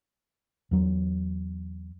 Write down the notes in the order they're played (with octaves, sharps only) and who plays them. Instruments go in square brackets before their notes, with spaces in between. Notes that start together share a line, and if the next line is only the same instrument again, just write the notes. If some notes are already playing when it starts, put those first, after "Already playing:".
[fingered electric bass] E2 F#3